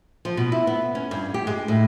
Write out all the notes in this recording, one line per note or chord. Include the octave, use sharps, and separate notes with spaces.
F3
B2
E4
B3
C#4
G2
G4
G#3
A2